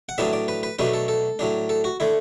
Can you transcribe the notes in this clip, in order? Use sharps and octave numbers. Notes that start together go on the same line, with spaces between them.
F#5
A2 F#3 B3 D4 E5
D5
B4
B4
B2 F#3 A3 D4 B4
A4
A4
A2 F#3 D4
A4
F#4
D3 A3 E4